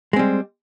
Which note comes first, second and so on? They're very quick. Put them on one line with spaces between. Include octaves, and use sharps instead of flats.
G#3 C4 G3